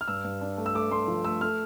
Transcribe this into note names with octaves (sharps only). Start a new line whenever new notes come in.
F6
G2 E6
G2
D4
A3
E6
A3 D6
A3 C6
F3
A3 E6
A3 F6